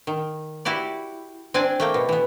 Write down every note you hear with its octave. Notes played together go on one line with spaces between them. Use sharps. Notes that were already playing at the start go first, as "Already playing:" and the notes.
D#3
E4 F#4 G4 D5
C4 D4 D5 G#5
A3 A#3 G5
B2
E3 B3